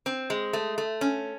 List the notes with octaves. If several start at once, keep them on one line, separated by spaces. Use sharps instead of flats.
C4
G#3
A3
A3
C#4